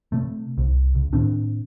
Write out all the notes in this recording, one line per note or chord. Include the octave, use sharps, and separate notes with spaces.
C3 A3
C2
C#2
A2 D#3 C4 D4